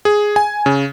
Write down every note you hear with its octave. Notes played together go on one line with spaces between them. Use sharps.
G#4
G#5
C#3